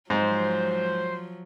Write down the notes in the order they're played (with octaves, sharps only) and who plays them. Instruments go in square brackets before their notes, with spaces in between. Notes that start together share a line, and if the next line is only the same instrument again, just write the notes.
[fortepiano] G#2 [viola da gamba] F3 F#3 [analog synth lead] C5